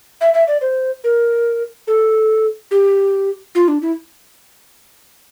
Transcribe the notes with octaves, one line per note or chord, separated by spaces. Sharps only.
E5
E5
D5
C5
A#4
A4
G4
F4
D4
E4